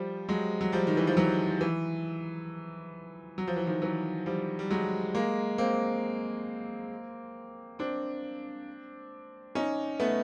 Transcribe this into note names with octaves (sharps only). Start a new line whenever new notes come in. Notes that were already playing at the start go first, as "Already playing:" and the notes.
Already playing: F3 G3
F#3 G#3
F#3
F3 G3
D#3
E3
F3
E3 F#3
E3
F#3
F3
E3
D#3 F3
E3 F#3
F3 G3
G3
F#3 G#3
G#3 A#3
A#3 C4
C4 D4
C#4 D#4
A3 B3